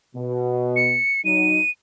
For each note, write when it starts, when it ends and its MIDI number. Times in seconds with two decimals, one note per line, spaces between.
0.15 0.99 47
0.76 1.23 97
1.25 1.59 54
1.25 1.59 63
1.25 1.70 99